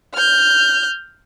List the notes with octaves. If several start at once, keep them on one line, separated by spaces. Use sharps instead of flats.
F6 G6